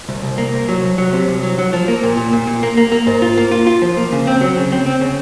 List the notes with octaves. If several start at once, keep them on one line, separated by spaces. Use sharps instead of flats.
C2
C2
A#3
C2
F#3
C2
F#3
C3
C2
F#3
F#3
F3
A#3
A#2
A#2
A#2
A#2
A#3
A#3
A#3
G#2
F4
A#3
F4
F4
F3
A#3
C#3
C4
F#3
C#3
C4
C4
C#3